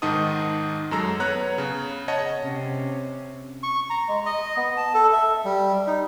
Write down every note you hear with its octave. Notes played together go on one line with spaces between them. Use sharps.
G#2 D#3 D#4 F#5 A5 D#6
F#2 F#3 G#3 A4 A#5 E6
B3 C#5 A#5 F#6
C#3
C#5 D#5 F#5 A5
C3 C#4
C#6
A#5
G#3
D#5
B3
A5
A4
E5
G3
D#4